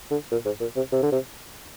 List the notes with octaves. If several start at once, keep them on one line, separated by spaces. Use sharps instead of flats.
D3
A#2
G#2
A#2
C3
C3
D3
C3